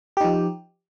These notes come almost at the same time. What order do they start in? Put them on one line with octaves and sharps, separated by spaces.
G4 D#4 F3